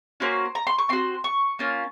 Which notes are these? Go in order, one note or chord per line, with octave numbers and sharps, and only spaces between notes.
A#3 C#4 F#4 C5
A#5
C6
C#6
C4 F#4 C6
C#6
A#3 C#4 F4